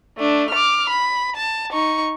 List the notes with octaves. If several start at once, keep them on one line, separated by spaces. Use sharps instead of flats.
A3 D4
D6 F6
B5
A5
D#4 C#6